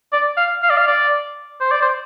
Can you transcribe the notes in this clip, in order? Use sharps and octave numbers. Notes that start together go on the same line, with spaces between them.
D5
F5
F5
D5
F5
D5
C5
D5
C5